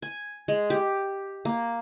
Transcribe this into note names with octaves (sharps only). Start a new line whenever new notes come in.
G#5
G#3
G4
A#3